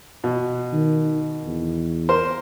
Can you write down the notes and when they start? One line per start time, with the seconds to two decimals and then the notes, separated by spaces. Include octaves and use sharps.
0.24 B2
0.73 D#3
1.44 E2
2.09 A#4 C5